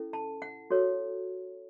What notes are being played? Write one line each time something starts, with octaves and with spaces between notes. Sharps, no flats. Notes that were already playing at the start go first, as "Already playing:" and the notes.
Already playing: C#4 E4 A4
A5
F#5
F#4 A4 C#5